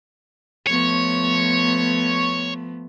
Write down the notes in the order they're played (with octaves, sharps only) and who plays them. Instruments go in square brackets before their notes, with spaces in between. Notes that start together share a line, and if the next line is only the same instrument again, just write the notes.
[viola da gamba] F3 A3 B3 [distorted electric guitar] C#5